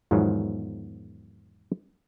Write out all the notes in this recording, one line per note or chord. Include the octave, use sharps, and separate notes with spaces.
E2 G#2 B2 D#3 F3 F#3